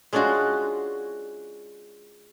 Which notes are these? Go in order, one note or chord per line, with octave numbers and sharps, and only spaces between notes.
G#3 C#4 D4 F4 F#4